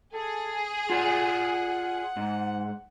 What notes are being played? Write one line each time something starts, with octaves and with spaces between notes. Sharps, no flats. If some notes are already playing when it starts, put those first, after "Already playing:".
G#4 A4
F4 D5 F#5 G#5
G#2